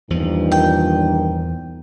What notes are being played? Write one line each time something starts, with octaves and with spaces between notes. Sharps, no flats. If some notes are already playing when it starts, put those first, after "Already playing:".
E2 G2 A#2 D#3 F3
G5